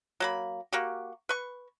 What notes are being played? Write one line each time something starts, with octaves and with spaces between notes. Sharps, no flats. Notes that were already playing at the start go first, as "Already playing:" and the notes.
F#3 A#3 B5
A#3 F#4 G4
B4 C#6